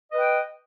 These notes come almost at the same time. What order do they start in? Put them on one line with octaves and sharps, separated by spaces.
D#5 B4 G5